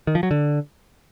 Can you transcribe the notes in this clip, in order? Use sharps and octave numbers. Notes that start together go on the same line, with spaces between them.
D#3
F3
F#3
D3